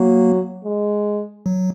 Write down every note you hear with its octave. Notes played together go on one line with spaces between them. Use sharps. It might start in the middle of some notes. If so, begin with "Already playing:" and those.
Already playing: F#3 A#3
G#3
F#3